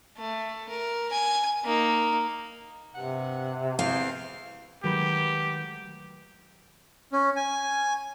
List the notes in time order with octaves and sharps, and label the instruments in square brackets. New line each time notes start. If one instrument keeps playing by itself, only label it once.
[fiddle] A3
A#4
G#5
A#3 D#4
[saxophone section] G2 F#5 [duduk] C3
[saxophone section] E2 C4 [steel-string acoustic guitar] F5
[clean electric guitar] D#3 B4 B5 [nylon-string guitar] F#3 G#3 A3 [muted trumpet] G4
[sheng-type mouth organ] C#4
G#5